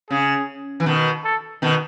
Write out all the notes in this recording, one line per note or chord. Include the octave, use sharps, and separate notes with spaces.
C#3 G#4
E3
B2 D#3
A4
B2 D#3